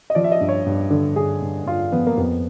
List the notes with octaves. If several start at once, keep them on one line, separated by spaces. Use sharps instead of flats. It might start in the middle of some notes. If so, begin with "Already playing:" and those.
D#5
F3 D5
E5
D#5
G2
C#5
G2
D3
G2 G#4
G2
G2 F4
F3 B3
A#3
F2 B3